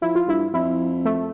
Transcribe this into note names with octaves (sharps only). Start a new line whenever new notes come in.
F3 E4
F4
G2 E4
F2 E4
A3